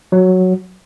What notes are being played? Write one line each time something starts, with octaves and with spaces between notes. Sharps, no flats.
F#3